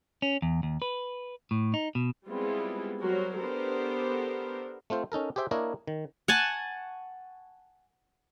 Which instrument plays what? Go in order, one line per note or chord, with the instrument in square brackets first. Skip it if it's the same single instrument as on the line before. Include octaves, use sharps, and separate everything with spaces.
[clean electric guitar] C#4
E2
D#2
B4
A2
D#4
B2
[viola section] G3 G#3 B3 C4 E4 F4
F#3 G3 F#4 A#4 C5
B3 D4 G4 A4 A#4 C5
[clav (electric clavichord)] A3 C4 F4 C5
C#4 D#4 A4 A#4
G4 G#4 C5 E5 G5
A#3 D4 E4 A#4 C#5 D#5
D#3
[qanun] F#5 G#5 A5 C#6